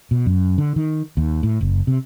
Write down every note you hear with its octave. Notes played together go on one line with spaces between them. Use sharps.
B2
F#2
D3
D#3
D#2
A2
F#1
C3